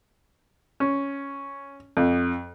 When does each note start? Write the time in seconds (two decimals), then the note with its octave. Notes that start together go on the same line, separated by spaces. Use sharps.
0.80 C#4
1.97 F2